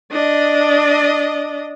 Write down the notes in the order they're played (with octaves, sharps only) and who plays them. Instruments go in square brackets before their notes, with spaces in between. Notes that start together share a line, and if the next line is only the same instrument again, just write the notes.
[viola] D4 D#5